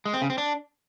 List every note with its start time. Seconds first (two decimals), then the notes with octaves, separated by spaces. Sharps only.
0.05 G#3
0.14 C4
0.22 C#3
0.30 C4
0.38 D4